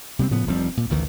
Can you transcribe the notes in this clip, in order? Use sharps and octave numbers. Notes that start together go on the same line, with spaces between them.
C3 G3 A#3 C4
A2 C#3 F3 B3
F1 F3 G3 C4
A#2
A1 D2 D#3 E3